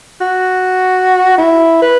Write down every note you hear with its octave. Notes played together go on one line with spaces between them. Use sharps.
F#4
E4
B4